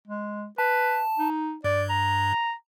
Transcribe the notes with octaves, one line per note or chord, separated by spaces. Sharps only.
G#3
B4 A5
D#4
G2 D5
A#5